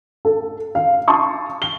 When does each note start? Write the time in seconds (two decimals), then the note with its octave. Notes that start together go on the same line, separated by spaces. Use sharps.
0.25 A4
0.75 F5
1.08 A5 C6 C#6 D#6
1.62 G7